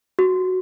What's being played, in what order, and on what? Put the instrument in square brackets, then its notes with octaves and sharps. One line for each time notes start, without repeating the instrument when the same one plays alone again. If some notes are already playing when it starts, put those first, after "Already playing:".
[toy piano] F#4